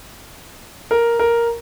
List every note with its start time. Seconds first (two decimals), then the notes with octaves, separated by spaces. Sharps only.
0.91 A#4
1.19 A#4